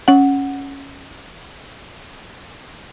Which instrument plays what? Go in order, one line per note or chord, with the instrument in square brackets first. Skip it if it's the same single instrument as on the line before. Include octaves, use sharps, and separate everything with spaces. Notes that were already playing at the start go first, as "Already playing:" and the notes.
[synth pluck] C#4 F#5